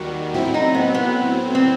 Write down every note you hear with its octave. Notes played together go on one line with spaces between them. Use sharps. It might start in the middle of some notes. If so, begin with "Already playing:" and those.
Already playing: D#2 D#3 G3 F#4
A2 F#3 C4 E4
D#4
B3
B3
C4